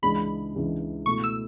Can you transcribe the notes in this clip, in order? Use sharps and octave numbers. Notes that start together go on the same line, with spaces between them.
C#2 C#3 E3 G#3 D4 B5
C#2 C#3 E3 G#3 D4
B2 A3 E4 C#6
E6